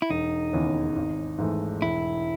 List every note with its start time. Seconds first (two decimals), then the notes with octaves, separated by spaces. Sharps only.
0.02 E4
0.10 E1 D#4
0.53 D#2 C#3 E3 B3
0.96 G#1
1.38 G#2 E3 A3
1.82 E1 E4